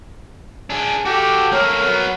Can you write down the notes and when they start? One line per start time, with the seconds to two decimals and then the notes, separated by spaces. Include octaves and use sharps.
0.70 D4 G#4
1.06 F#4 G4 A4
1.52 A3 A#3 A#4 C#5
1.84 F#3 B3